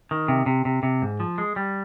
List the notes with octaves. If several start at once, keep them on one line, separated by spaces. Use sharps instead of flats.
D#3
C3
C3
C3
C3
G#2
F3
G#3
G3